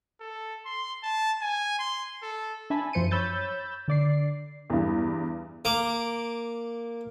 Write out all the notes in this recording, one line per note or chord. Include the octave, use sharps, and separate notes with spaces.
A4
C6
A5
G#5
C6
A4
D4 E5 G#5 A5 B5
F#2 F3 C5 C#7 D#7
C#5 B5 E6 G6 A6
D3 D5 C7
E2 G2
A#3 D6